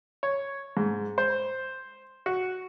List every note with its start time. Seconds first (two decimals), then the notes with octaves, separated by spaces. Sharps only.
0.23 C#5
0.77 G#2
1.18 C5
2.26 F#4